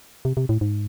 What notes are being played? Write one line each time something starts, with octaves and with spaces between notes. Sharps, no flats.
C3
C3
A2
G#2